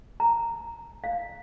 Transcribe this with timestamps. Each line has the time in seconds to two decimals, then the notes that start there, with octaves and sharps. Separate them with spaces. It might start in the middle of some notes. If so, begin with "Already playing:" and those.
0.20 A#5
1.04 F5